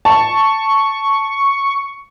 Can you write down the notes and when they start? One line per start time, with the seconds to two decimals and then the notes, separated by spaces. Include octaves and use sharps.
0.05 A5 C#6